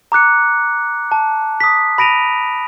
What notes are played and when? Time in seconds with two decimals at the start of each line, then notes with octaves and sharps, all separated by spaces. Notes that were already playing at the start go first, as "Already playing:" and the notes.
0.12 A#5 D6 F#6 C#7
1.12 A5
1.60 D#6 B6
1.98 B5 A#6 D7 D#7 F7